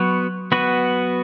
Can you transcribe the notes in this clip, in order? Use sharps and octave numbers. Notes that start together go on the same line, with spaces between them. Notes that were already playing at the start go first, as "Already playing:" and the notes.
Already playing: F#3 B3 F#4 B4
B3 F#4 B4